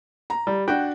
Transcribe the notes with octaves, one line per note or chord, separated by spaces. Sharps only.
A#5
G3
D4 F#4 G5